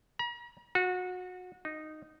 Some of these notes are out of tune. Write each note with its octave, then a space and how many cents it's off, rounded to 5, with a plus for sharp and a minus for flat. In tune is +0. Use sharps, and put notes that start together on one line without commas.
A#5 +45
F#4 -25
D#4 -10